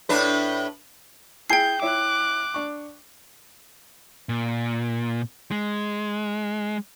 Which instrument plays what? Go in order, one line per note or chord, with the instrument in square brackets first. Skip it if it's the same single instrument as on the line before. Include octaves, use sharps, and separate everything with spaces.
[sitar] A2 D4 B4
[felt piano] E4 G#4 G#5 [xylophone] G5 C7 [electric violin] G6
[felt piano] E4 C#5 E5 [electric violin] D6 F#6
[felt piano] D4 C#6
[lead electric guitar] A#2
G#3